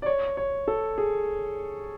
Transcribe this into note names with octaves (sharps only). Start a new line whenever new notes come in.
D5
C#5
C#5
A4
G#4